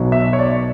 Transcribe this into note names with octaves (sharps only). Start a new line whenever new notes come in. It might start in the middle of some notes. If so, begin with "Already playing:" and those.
Already playing: B1 B2 F#3
E5
C#5
D5